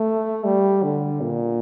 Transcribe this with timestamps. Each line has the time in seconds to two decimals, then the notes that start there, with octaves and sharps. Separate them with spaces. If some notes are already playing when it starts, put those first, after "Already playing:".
Already playing: A3
0.44 G3
0.83 D3
1.22 A#2